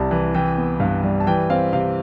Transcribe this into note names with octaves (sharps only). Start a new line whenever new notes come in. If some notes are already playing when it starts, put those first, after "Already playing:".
Already playing: C2 C3 G3 A5
E3
E3 G5
B3
G2 F5
G3
A5
E3 G5
C4 F5
C3 F5